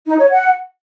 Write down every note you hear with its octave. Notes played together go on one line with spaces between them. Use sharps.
D#4
C#5
F#5